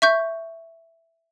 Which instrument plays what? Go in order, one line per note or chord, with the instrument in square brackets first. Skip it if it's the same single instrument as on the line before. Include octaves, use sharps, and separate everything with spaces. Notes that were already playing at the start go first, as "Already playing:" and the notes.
[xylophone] E5 C#6 G6